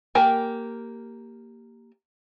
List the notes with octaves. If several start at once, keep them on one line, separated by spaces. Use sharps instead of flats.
A#3 G4 A#4 G#5